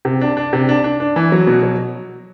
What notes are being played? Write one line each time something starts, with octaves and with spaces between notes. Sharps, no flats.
C3
D4
D4
C3
D4
D4
D4
E3
F#3
B2
F#3